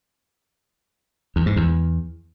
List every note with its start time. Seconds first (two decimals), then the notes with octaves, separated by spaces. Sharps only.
1.36 E2
1.46 G#2
1.56 E2